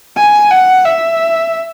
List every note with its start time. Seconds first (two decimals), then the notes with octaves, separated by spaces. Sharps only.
0.17 G#5
0.51 F#5
0.85 E5